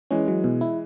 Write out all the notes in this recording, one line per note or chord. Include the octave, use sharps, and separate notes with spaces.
E3 G#3 C#4
F#3
B2
E4